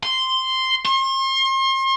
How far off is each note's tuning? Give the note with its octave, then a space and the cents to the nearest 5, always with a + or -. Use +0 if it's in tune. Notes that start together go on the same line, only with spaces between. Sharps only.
C6 -5
C6 +40